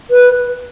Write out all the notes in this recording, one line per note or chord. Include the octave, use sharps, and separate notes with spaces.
B4